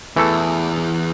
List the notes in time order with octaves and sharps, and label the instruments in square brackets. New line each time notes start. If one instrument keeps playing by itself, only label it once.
[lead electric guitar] E2 [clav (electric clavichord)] E3 A3 A4